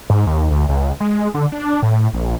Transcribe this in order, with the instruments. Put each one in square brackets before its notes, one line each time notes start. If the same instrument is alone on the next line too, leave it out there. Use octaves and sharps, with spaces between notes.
[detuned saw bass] G#2
D#2
D2
C#2
G#3
D3
D4
A2
A#1